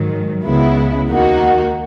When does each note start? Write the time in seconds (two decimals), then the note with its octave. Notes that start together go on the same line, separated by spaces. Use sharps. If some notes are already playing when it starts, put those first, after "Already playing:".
Already playing: G#2 D#3 F#3
0.44 C#2 C#3 G#3 B3 E4
1.09 D#2 D#3 A#3 D#4 F#4